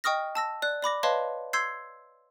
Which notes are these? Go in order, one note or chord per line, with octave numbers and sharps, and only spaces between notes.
D#5 G5 C#6 D#6 F6 A#6
A5 E6 A#6
D5 F#6
D5 B5 D6 A#6
B4 C#5 D#5 F5 A5 C6
C6 E6 G6 G#6 C7